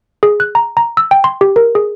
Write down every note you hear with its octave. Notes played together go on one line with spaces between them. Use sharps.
G#4
F#6
A#5
A#5
E6
G5
C6
G4
A#4
G#4